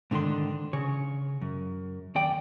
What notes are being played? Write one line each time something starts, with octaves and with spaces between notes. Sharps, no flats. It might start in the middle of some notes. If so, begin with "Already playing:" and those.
G#2 D3 D#3 D4 C6
C#3 C#5
F#2
D#2 D5 G5